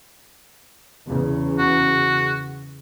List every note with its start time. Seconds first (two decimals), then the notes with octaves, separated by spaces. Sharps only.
1.05 E2 C#3
1.59 F#4